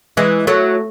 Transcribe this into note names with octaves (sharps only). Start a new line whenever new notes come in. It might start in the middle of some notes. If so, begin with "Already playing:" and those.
E3 G#3
F#3 A3